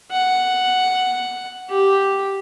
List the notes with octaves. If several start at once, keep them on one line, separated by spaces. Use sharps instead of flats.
F#5
G4